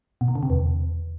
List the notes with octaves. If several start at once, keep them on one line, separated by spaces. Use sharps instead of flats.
B2
D#3
D3
C3
E2